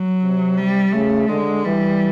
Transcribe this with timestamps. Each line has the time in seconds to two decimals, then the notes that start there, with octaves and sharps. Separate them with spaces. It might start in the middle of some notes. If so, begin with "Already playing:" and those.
Already playing: F#3
0.21 C3
0.58 G3
0.93 C#3 A3
1.29 D3 G#3
1.65 E3 G3